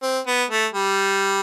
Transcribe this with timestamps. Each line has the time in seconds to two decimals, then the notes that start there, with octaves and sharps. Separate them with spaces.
0.03 C4
0.27 B3
0.50 A3
0.74 G3